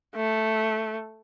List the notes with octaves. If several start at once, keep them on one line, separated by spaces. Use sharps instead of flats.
A3